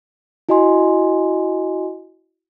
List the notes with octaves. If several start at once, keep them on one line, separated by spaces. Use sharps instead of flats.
E4 F#4 D#5 G#5 C6